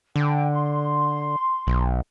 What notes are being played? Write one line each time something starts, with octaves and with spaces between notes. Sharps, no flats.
D3 G5
C6
B1